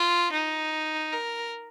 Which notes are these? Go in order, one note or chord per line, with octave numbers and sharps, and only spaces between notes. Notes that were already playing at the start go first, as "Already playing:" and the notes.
Already playing: F4
D#4
A#4